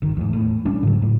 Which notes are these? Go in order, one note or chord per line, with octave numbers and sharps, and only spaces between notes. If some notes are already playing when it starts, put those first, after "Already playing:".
G1 D#3
E2 G#2
A2
E1 G3 C#4 D4
G#2 C#3 F#3
A2